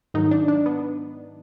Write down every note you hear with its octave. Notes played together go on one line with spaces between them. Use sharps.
G#2 D#3 F#3 D#4
D4
D4
B3